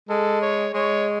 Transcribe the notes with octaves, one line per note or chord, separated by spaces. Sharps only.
G#3 A4
C#5
G#3 C#5